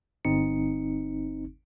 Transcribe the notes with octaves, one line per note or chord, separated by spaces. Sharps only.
G1 C4 D#4 C#7